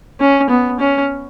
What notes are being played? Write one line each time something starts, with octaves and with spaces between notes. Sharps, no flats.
C#4
B3
C#4